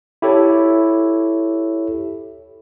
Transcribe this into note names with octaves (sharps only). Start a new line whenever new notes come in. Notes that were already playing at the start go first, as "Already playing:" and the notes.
E4 G4 A4 C#5